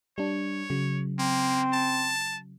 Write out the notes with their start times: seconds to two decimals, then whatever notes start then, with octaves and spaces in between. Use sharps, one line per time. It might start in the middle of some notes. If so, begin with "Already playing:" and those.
0.18 G3 D4 C#5
0.70 C#3 F#3
1.19 A#3 C4
1.73 A5